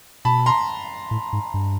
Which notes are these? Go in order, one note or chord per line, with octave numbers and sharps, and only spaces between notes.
B2 A5 B5
A#5 C6
A2
G#2
G2